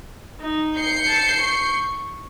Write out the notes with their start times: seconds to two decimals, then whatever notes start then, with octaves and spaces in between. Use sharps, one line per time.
0.40 D#4
0.77 G6 C7 C#7
1.07 A5
1.40 C#6